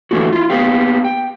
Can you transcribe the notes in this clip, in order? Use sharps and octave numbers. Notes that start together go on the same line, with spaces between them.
D3 E3 A3 A#3 E4 F#4
E4 F4
A#3 B3 G4 F5
G5